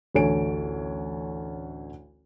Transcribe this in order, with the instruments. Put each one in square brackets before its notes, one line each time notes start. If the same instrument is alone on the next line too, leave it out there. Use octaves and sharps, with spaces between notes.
[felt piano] A1 D2 A4 C#5 G#5 D7